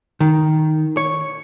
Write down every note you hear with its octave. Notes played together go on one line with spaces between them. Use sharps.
D#3
C#5